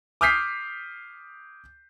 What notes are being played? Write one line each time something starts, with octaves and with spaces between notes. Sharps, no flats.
D6 D#6 F6 G6 B6 C7